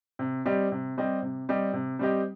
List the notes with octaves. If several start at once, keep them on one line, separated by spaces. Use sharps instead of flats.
C3
G3 C4 G4 D#5
C3
G3 C4 G4 D#5
C3
G3 C4 G4 D#5
C3
G3 C4 G4 D#5